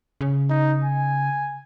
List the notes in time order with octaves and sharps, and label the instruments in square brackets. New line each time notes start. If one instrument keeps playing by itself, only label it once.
[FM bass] C#3
[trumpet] D#4
G#5